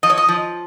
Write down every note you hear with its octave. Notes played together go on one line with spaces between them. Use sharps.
F3 D#5
C#5
D#5
F3